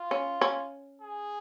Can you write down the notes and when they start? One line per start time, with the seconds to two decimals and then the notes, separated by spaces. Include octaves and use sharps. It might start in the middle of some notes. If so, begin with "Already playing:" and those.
Already playing: F4
0.11 C#4
0.41 C#4
1.02 G#4